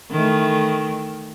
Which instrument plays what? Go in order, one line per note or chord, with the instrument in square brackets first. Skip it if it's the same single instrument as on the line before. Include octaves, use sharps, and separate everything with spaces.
[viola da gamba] D#3 E3 A3